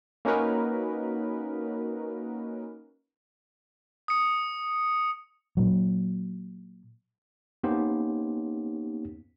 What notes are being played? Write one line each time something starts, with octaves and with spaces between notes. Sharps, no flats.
A#3 C#4 D#4 F#4 A#4 B4
D#6 C#7
A#2 F#3
A#3 B3 C#4 D#4 G4 C5